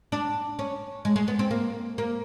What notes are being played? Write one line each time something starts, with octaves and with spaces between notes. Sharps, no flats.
D4
C#4
G#3
G#3
B3
C4
A#3
A#3